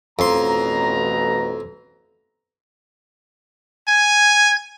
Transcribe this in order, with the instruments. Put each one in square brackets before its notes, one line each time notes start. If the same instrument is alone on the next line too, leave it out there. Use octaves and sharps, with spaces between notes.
[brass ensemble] A1 B2 A#5 [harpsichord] F2 C6
[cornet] G#5 [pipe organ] G#6